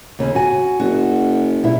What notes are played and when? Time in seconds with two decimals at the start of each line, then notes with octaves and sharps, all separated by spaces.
0.19 D#2 C#3
0.35 F#4 G#5
0.80 F#1 F#4
1.63 B2 G3 E4